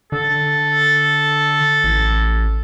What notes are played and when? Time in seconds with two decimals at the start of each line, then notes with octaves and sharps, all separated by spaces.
0.12 D3 A4
1.84 A1